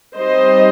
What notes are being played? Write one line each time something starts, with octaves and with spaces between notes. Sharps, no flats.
G3 C4 D#4 C5 D#5